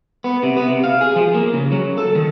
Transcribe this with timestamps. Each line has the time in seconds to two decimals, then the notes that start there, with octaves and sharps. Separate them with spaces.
0.24 B3
0.43 C3
0.57 B3
0.68 C3
0.84 F5
1.01 G#4
1.16 F3
1.35 A#3
1.54 C#3
1.72 F#3
1.98 A4
2.15 D#3